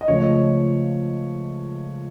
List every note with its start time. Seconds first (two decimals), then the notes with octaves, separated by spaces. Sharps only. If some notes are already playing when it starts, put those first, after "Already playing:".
0.01 D#5
0.08 C#2 C#3 F3 A3 C#4 C#5